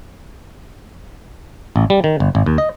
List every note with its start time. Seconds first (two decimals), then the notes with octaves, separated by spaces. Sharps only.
1.76 A1
1.90 G3
2.04 D#3
2.20 G1
2.35 G#1
2.46 D#2
2.58 D#5